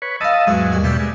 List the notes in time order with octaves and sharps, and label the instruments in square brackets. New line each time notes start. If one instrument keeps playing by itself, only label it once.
[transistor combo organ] B4 C#5
[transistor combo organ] D#5 A5 E6 [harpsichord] F5 B5
[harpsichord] E2 G#2 E5 [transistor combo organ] F#3 G#3
[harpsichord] D#2 G3 G#5
[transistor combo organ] B2 G3 [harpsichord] D4 E5 A5
[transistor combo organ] G#3